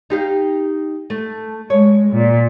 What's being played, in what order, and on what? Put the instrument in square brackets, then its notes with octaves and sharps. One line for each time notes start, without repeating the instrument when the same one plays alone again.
[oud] D#4 G4 F5
A3
[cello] G#3 [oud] C#5
[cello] A#2